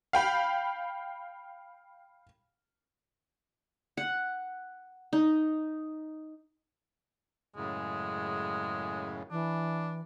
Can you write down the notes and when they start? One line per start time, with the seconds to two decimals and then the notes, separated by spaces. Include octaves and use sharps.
0.13 F5 G5 B5
3.97 F#5
5.13 D#4
7.56 F#2 A2 C#3 G#3
9.31 E3 D4